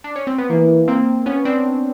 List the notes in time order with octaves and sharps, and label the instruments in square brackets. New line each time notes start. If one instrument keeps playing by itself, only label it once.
[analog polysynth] D4
C#4
C4
B3
[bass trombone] E3 [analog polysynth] A#3
[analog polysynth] A#3 C4
B3 C#4
C4 D4